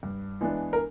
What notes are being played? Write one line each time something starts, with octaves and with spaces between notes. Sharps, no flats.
G2
E3 G#3 B3 D4
A#4